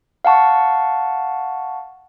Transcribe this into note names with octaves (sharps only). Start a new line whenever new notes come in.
F5 F#5 A5 C#6